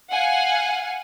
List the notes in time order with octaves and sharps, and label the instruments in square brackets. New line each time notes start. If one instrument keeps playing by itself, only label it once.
[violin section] F5 F#5 G#5